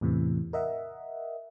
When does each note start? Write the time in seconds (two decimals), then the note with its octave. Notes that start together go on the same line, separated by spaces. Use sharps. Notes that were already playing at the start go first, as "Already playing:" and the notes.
0.01 E2 A2 C3 E3
0.53 A#4 D#5 E5 F#5